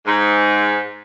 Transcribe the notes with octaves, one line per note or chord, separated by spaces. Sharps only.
G#2